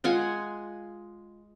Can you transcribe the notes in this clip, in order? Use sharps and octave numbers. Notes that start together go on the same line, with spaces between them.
G#3 F4 F#5 G#5